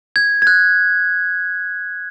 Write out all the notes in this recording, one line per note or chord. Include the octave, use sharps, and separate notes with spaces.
G#6
G#6
F#6